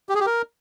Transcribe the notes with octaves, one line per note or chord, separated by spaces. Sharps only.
G4
G#4
G4
A#4